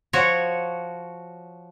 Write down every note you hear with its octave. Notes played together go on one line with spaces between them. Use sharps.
F3 F#4 C#5